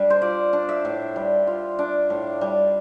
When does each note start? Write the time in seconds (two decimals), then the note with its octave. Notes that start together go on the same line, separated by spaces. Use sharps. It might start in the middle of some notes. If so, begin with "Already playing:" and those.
Already playing: G3 D4
0.10 C5
0.22 F4 D5
0.53 D4
0.69 E5
0.85 A2
1.16 G3
1.47 F4
1.79 D4
2.10 A2
2.41 G3